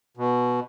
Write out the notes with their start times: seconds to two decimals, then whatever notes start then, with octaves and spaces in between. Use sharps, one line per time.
0.17 B2